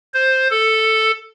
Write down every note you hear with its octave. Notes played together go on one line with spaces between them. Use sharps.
C5
A4